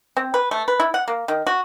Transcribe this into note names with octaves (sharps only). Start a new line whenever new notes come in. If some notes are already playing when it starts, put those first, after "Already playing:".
C4
B4
A3
B4
E4
F#5
A#3
D#3
F#4